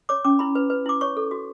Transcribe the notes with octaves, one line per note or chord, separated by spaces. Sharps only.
C#5 D6
C#4 D6
E4 B5
B4
B4
E4 D6
C#5 C#6
A4
F#4